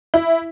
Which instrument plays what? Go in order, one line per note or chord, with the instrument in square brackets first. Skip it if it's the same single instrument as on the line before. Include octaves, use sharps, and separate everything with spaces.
[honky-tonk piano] E4